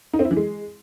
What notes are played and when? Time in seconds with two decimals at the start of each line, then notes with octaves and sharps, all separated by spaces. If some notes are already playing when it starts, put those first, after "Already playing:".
0.13 D#4
0.19 C4
0.25 E4
0.31 E3
0.37 G#3